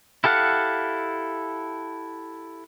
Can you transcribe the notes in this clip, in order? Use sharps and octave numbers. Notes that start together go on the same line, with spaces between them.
E4 G4 A4 F5 F#5